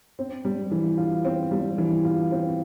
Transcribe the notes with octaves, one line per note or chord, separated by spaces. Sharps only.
C4
G3
E3
F4
C4
G3
E3
F4
C4